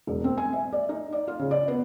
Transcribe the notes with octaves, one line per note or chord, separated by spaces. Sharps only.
E1
C4
G#5
E5
D5
D#4
D5
F4
C#3
D5
B3